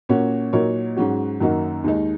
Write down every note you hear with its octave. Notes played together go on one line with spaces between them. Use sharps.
A#2 A#3 C#4 F#4 C#5
A#2 F#3 D#4 A#4 C#5
G#2 F#3 C#4 F#4
F#2 D#3 A#3 D#4 F#4
D#2 D#3 G#3 D#4